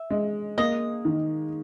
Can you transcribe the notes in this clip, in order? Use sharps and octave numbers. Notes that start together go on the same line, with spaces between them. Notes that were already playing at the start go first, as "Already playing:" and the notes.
Already playing: E5
G#3
A#3 D#5
D#3